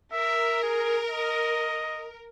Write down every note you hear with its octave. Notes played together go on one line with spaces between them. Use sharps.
A#4 E5
G#4
D#5